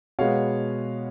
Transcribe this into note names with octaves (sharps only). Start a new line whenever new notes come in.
B2 G#3 B3 C#5 F5